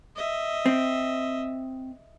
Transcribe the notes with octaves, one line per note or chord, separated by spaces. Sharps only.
D#5 E5
C4